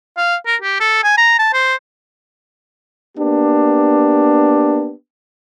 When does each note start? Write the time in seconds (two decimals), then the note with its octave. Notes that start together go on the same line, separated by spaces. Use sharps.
0.17 F5
0.46 A#4
0.62 G4
0.80 A4
1.03 G#5
1.17 A#5
1.39 A5
1.53 C5
3.18 A#3 B3 D4 G4